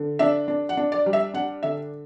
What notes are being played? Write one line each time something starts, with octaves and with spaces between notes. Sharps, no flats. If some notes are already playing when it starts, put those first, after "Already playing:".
Already playing: D3
D4 E5
D4
F#5
D4
D5
G3
E5
D4 F#5
D3 E5